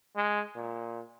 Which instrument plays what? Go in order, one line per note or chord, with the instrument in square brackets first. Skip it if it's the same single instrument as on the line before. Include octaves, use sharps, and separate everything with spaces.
[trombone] G#3
A#2